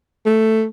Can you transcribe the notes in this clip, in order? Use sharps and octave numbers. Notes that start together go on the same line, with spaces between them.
A3